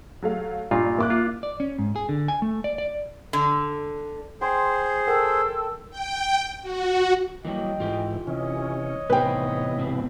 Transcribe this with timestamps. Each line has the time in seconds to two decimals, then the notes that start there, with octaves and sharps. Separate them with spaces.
0.22 F#3 A3 F5
0.71 G2 A#2 D#4 F4
0.99 A#3 E5 D6 F#6
1.10 F4
1.43 D5
1.60 C#4
1.79 G#2
1.96 G#4
2.09 D3
2.28 G#5
2.42 A3
2.64 D5
2.78 D5
3.33 D3
4.41 G#4 C5 G5 C6
5.07 A4 A#4 G5
5.91 G5
6.62 F#4
7.45 E3 F#3 G3 A#3 D#5 G5
7.80 G#2 E3 F4 G4
8.27 C3 E3 C#4 C#5 D#5
9.10 A2 C3 E3 B3 D#4 B4 C5 G5
9.77 G#2 B2 C4